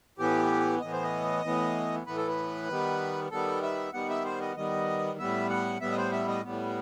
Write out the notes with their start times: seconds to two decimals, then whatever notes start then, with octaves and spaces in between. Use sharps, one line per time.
0.18 A2 E3 B3 G4
0.81 A2 E3 B3 D#5
0.92 C5
1.03 D#5
1.44 A2 E3 B3
2.06 A2 E3 B3 B4
2.17 A4
2.27 B4
2.68 D#3 G3 B3
3.31 D#3 G3 B3 A4
3.63 E5
3.93 D#3 G3 B3 F#5
4.09 E5
4.25 C5
4.41 D#5
4.56 D#3 G3 B3 D#5
5.19 A2 G3 B3 E5
5.50 F#5
5.81 A2 G3 B3 E5
5.92 D#5
5.97 C5
6.12 E5
6.28 D#5
6.43 A2 G3 B3